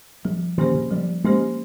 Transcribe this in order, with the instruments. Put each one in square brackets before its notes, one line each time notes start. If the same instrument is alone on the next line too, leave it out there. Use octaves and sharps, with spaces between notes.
[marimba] F3 [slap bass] G3
[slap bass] D#3 [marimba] A#3 C#4 G4 C5
[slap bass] C#3
[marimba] F3 [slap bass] G3
[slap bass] G#3 [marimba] A#3 C#4 G4 C5